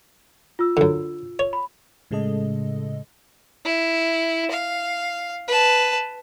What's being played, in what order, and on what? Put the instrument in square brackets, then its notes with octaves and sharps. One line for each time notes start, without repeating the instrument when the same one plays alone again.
[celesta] F4 E6
[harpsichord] F#2 D3
C#5
[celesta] B5
[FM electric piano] A2 C#3 G#3 A4 D#5
[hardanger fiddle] E4
F5
B4 A5